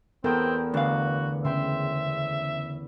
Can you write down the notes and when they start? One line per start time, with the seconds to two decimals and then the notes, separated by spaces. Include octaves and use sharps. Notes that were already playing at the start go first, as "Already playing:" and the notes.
0.24 E2 B3 C4 A4 A#4 G5 D#6
0.74 D2 D4 F#4 F5
1.45 C#3 C5 E5 G5 C6